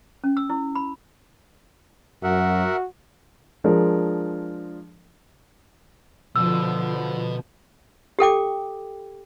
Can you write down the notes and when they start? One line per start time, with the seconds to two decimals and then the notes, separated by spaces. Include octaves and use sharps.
0.24 C#4
0.37 E6
0.50 E4
0.75 B5
2.23 F#2 F#4 A#4 E5 F#5
3.64 F3 G#3 D4 G#4 A#4
6.36 B2 D3 F3 E6
8.19 G4 A4 G5 D6